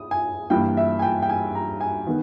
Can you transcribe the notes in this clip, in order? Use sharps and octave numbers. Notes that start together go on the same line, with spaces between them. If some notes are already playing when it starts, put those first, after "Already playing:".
Already playing: D#6
G#5
G2 E3 A#3 G5
E5
G#5
G5
G5
G#5
A#5
G#5
D#3 B3